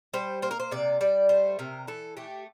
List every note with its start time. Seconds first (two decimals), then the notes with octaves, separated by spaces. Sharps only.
0.14 G3 C5
0.42 A#3 C5
0.51 A#4
0.60 C5
0.71 C3 D5
1.01 G3 D5
1.29 A3 C5
1.59 C3 A#4
1.87 E3 A4
2.17 A3 G4